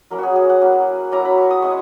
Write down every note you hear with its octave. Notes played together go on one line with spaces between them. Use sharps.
F#3 A#3 C#4 E4 A#4
F#4 G#4
G#4
F#5
F#3 A#3 C#4 E4
F#3 A#3 C#4 E4 A#5
B5
C#6
D#6
G#3 C#4 E4 C#6